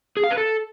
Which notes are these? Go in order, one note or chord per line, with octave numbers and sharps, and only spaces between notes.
G#4
F5
B4
A4